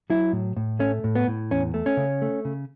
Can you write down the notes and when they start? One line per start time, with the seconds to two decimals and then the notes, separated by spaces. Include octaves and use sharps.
0.10 F#3 E4
0.33 A2
0.57 A2
0.79 A3 C#4
1.04 A2
1.15 B3
1.28 A2
1.51 E2 C#4
1.74 A3
1.86 C#4
1.97 C#3
2.22 A3
2.45 C#3